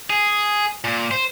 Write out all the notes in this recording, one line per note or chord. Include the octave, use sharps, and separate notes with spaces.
G#4
A#2
C5